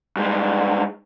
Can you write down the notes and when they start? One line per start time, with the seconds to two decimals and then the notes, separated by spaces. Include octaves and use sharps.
0.17 G2 G#3